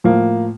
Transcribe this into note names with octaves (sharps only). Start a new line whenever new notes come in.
A2 F3 A#3